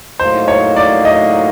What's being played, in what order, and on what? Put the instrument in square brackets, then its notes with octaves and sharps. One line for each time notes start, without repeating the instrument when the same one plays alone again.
[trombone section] A2 F#3 A#3 D#4 [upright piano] C5
[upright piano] C#5
D5
D#5